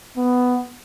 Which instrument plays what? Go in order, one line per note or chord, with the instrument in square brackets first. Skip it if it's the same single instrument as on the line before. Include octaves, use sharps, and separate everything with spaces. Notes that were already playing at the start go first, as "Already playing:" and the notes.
[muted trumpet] B3